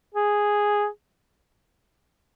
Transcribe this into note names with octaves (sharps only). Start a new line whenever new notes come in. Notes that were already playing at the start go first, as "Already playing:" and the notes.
G#4